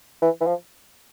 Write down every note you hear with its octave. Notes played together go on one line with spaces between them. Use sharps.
E3
E3
F3